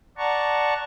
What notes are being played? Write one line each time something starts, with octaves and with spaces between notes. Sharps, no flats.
D5 F#5 A5 A#5 C#6